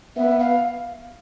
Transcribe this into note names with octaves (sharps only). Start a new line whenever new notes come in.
B3 E5
F5